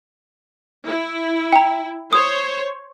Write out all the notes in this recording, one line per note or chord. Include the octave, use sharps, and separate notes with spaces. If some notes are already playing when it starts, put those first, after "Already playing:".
E4
G5 A#5
C5 C#5 D#6